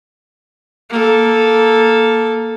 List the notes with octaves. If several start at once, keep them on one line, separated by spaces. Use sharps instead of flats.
A#3 A4